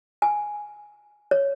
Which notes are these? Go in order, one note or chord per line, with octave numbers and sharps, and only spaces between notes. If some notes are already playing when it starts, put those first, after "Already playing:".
G#5
C#5